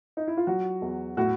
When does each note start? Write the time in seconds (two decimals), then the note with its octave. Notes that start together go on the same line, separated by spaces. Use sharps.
0.17 D#4
0.28 E4
0.37 F4
0.47 F#3 F#4
0.82 E2
1.17 A2 F#4